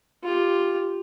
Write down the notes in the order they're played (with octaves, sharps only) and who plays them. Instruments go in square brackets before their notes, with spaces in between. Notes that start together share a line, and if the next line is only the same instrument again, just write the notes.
[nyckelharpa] F4 G4